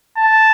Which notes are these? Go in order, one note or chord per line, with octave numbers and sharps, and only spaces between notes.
A5